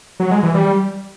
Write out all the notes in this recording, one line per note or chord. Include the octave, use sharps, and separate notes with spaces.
F#3
G#3
E3
G3